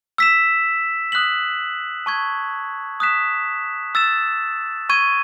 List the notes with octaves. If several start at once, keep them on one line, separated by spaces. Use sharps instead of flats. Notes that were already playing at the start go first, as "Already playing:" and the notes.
E6 B6 E7
D#6 F#6 B6 F#7
A5 C#6 G#6
D#6 F#6 B6 E7
E6 A6 E7
C#6 G#6 D#7